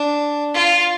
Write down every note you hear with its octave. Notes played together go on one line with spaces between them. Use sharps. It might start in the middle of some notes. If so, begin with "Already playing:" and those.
Already playing: D4
F4